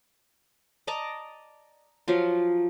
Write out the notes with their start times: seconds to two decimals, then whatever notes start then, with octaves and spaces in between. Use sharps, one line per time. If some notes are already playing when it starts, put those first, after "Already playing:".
0.87 D5 D#5 A5 A#5
2.08 F3 F#3 F4